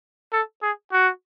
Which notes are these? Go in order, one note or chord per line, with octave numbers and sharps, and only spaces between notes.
A4
G#4
F#4